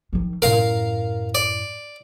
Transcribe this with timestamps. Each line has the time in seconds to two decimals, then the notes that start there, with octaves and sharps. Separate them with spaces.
0.13 D#3 F3
0.42 F#2 A2 A#4 F5
1.35 D5